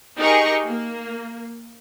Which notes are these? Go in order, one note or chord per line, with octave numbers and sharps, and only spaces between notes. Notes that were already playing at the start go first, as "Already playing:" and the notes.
D#4 G4 G#4 A#4 C#6
A#3